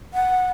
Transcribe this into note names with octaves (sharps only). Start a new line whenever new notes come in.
F#5